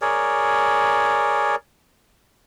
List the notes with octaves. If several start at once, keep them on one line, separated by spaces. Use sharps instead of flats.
G#4 A#4 C#5 D5